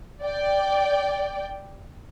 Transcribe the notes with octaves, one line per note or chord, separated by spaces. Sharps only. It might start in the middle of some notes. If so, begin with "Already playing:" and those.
D5 G5